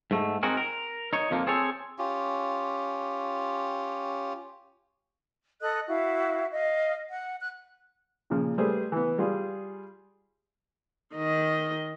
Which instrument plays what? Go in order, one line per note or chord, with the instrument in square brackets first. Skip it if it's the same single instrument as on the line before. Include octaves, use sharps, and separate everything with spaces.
[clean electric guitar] G#2 A3
C4 D#4 F#4 G#4 A#4
A#4
D#4 C#5
F2 F3 A#3
C4 G#4 A4 C5 C#5
[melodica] C#4 F4 G4
[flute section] A4 D#5 D#6 F#6
E4 F#4 E5 F5
D#5 F5
F#5
F#6
[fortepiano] A#2 C#3 F3
G3 A3 G#4 B4 C5
E3 B3
G3 F4 G#4
[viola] D#3 D#5